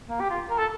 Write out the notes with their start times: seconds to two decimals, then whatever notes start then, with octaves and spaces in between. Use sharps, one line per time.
0.09 A#3
0.20 G4
0.30 F4
0.50 A#4
0.58 A4